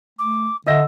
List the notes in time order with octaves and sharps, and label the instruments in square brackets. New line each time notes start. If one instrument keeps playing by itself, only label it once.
[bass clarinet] A3 [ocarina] D6
[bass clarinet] D3 [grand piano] D#5 E6 A#6 [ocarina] E5